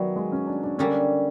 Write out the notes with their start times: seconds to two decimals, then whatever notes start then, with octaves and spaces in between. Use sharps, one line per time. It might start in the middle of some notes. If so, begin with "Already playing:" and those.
Already playing: D#3 F#3 G3 B3 E4
0.16 G#3
0.32 C#4
0.47 D4
0.63 D4
0.78 D3 G3 A#3 C#4